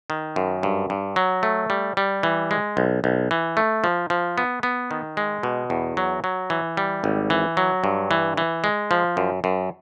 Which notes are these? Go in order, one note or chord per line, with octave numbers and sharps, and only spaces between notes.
D#3
F#2
G2
G2
F#3
A3
G3
G3
E3
G#3
B1
B1
E3
A3
F3
F3
B3
B3
D#3
G#3
B2
E2
F#3
F#3
E3
G3
G#1
E3
F#3
G2
E3
E3
G#3
F3
F#2
F#2